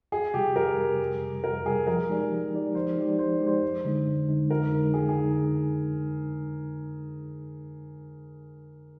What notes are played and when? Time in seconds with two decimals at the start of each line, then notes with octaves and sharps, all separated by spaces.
0.12 F2 G#4
0.34 C3 G3 G4
0.56 F2 A#4
0.78 C3 G3
0.99 F2
1.21 C3 G3
1.44 F2 A#4
1.65 C3 G3 G#4
1.87 F3 A#4
2.09 G#3 D#4 G4 D5
2.31 F3
2.53 G#3 D#4 G4 D5
2.75 F3 C5
2.97 G#3 D#4 G4 D5
3.19 F3 C5
3.40 G#3 D#4 G4 D5
3.47 C5
3.62 F2
3.84 D3 G#3 D#4
4.07 F2
4.28 D3 G#3 D#4
4.50 F2 A#4
4.72 D3 G#3 D#4
4.93 F2 G#4
5.09 G#4
5.16 D3 G#3 D#4